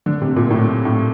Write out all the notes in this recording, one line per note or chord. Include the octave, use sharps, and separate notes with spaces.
D3
C3
A#2
A2
A2